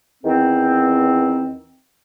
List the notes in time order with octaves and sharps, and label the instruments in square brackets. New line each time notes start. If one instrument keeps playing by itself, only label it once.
[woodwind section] E2 D#3 C4